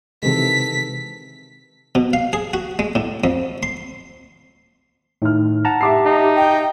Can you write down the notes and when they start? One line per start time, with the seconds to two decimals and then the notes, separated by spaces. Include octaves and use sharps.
0.23 C3 D#3 E3 G#3 A4 B6
1.95 B2
2.13 F5
2.33 G#4
2.54 F#4
2.79 G#3
2.95 A2
3.24 F2
3.63 C6
5.22 A2 D#3 F6
5.65 F#5 A5 A#5
5.81 G4 E5 D6 C7
6.06 D#4
6.35 G5